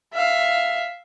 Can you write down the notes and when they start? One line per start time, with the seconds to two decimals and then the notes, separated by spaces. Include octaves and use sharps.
0.14 E5 F5